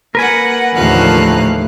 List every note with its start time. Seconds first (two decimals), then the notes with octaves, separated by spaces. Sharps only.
0.15 A#3 A#4 B4 F#5 G#5
0.75 D#2 A2 D3 E3 F3 A3 F5 F#6